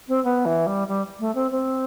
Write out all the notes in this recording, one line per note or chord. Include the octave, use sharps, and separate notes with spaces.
C4
B3
E3
G3
G3
A3
C4
C4